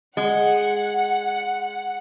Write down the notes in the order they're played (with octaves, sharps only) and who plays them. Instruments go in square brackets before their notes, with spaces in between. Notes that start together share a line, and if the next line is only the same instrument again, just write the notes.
[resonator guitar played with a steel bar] G#3 [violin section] F#5